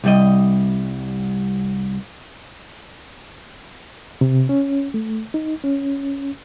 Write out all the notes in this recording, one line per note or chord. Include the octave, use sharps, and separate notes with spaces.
C2 G3 D#5
C3
C#4
A3
D#4
C#4